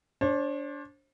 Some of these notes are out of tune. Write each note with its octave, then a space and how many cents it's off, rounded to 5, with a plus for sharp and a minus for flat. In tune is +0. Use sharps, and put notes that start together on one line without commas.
D4 -20 C5 +40